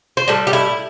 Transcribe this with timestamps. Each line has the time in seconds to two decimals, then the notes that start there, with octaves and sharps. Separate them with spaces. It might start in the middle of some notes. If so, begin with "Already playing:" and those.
0.17 C5
0.28 A2 G3 A4
0.47 G4
0.53 E4